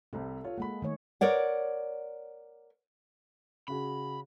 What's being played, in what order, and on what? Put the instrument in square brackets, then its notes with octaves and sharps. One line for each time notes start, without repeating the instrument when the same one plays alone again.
[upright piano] C2 C3 [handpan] A4
[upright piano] F4 C#5
[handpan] G#3 A#3 [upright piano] F#5 B5
[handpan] D#3 A3 C#5
[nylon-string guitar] A#4 C#5 D5 F#5
[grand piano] C#3 F#4 G#4 [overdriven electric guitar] B5